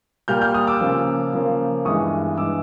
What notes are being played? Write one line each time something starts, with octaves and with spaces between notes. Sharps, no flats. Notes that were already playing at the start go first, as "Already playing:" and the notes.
A#2 G3 A#3 F6 G6
F6 G6
D#6 F6
D6 E6
C#3 F3 A#3
C#3 F3 A#3
G2 E3 G#3 B3 C#6 D#6
G2 E3 G#3 B3 D6 E6